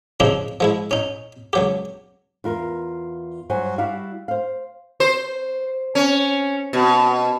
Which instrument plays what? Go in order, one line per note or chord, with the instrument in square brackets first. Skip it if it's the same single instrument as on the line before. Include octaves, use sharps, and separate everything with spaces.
[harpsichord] C#3 F3 G3 C4 D4 D#4
F3 G#3 E4
C#4 D#4
C#2 F#3 G4
[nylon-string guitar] E2 F4 A#4
G2 F#3 C5 F#5 G#5
G3 E4 F#4 D5 F5
C5 F5
[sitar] C5
C#4
B2